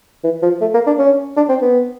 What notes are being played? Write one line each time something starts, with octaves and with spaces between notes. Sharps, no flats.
E3
F3
A3
A#3
D4
C#4
D4
C4
B3